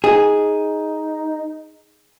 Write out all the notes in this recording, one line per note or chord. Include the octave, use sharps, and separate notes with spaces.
D#4 G#4